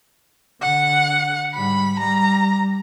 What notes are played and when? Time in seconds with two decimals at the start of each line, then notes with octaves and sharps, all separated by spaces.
0.62 D3 F#5
1.54 G#2 G3 B5
1.99 G3 A#5